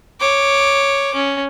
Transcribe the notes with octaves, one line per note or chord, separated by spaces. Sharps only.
C#5 D6
C#4